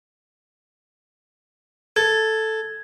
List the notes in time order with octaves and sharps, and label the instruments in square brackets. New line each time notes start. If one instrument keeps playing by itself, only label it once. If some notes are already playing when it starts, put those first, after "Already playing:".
[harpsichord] A4 [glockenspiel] G#6